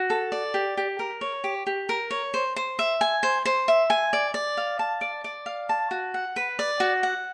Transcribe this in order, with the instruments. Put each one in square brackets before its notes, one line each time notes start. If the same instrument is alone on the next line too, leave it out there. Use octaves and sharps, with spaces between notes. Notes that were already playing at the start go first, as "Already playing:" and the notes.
Already playing: [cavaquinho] F#4
A4
D5
G4
G4
A#4
C#5
G4
G4
A#4
C#5
C5
C5
E5
G#5
C5
C5
E5
G#5
D5
D5
F5
A5
D5
D5
F5
A5
F#4
F#5
B4
D5
F#4
F#5